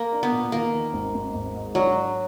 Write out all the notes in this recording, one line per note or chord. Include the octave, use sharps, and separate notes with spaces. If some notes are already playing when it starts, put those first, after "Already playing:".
Already playing: A#3
D4
B3
A#2
D#3 A#3
D#3
G#1
G#1
G#1
G#2
F#3 D4
D4